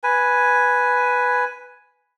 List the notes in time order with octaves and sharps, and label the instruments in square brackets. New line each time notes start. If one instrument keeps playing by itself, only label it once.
[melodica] B4 G#5